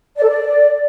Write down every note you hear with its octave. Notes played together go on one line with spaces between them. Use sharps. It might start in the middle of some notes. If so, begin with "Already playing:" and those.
D5
A4
D5